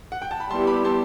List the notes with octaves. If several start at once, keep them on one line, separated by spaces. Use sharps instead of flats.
F#5
G5
A5
B5
G3 B3 E4 G4 A5 C6
B5 D6
A5 C6